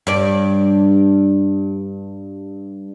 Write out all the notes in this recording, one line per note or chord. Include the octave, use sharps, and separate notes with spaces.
G2 D5